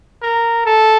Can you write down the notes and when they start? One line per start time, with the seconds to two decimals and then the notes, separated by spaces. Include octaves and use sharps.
0.22 A#4
0.65 A4